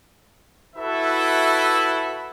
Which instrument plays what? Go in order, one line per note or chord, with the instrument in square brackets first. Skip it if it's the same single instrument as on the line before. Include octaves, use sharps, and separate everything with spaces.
[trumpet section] E4 F#4 A4 B4 E5